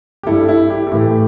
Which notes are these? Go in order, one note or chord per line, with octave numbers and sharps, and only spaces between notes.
G4
G2 G3 E4 A4
E4
G4
A4
A2 E3 A3 G4